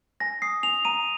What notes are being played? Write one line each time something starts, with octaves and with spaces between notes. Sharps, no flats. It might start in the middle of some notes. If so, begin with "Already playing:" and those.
G#5 A#6
D#6 C7
G#5 F7
A#5 D#7